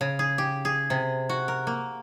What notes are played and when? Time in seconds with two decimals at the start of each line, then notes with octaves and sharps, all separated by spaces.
0.01 C#3
0.19 G#4
0.38 G4
0.65 G#4
0.90 C3
1.29 F#4
1.48 A#4
1.67 A#3